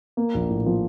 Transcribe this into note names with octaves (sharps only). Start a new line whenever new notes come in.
A#3
A#1
A2
F3